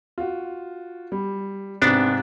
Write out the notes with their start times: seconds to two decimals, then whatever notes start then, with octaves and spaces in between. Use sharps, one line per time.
0.18 F4 F#4
1.12 G3
1.82 G#2 C3 B3 C4 D4